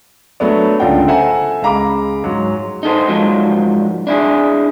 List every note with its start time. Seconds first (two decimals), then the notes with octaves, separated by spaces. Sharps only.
0.40 F#3 A3 B3 D4
0.80 C#2 D3 D4 F4 F#5 G5
1.07 A4 C5 E5 F#5 G#5 A#5
1.62 C#2 G#3 F5 A#5 B5 D6
2.24 G#2 F#3 G#3
2.83 D#4 A4 C5
3.08 G#2 F3 F#3 A#3
4.07 D4 E4 G#4